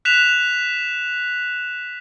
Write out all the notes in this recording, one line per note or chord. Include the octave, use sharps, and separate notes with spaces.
F#6 B6 E7 F7